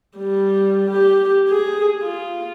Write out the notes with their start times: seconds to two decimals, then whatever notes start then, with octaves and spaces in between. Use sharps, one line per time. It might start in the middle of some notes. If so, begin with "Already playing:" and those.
0.18 G3
0.91 G4
1.49 G#4
2.02 F4